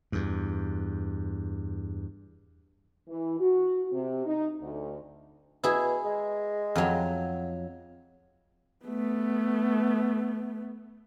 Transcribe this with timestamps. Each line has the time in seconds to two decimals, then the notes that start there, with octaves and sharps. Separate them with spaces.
0.12 E2 G2
3.08 E3
3.40 F#4
3.92 C3
4.26 D#4
4.60 D2
5.64 B2 E4 G#4
6.05 G#3
6.75 F2 F#3
8.85 A3 B3